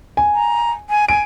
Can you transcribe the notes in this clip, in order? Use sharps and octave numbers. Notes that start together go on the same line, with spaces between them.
G#5
A#5
G#5
G#5 D7